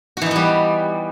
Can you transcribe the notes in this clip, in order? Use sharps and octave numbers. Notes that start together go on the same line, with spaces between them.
E3 G3 B3 D#4 F#4